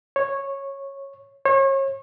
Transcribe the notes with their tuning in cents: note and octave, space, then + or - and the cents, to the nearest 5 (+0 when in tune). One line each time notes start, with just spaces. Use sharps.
C#5 -10
C#5 -35